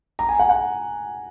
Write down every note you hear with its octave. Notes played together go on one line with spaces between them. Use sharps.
A#5
G#5
F#5
F#5